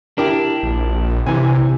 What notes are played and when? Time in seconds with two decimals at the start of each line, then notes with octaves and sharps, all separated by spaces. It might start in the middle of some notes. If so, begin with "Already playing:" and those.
0.18 D4 E4 G4 A#4
0.63 A#1
1.26 C3 E3 G#5